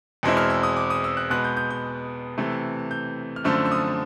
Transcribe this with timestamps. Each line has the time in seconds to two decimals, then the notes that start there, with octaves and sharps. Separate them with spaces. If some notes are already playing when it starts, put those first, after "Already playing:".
0.23 E2 B2 G#3 C4 E4
0.37 F6
0.50 E6
0.63 D#6
0.76 D6
0.90 D#6
1.04 E6
1.17 F#6
1.30 B2 G#3 B3 F#6
1.44 G6
1.57 G6
1.71 G6
2.38 C3 E3 A3
2.91 G6
3.36 F6
3.44 F#2 D3 F3 A3 C4 E6
3.65 E6
3.72 D#6